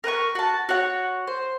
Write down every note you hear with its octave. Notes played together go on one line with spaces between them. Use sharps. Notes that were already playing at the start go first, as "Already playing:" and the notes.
A#4 B4 F#5 C#6
F#4 A5
F#4 C#5 F#5
C5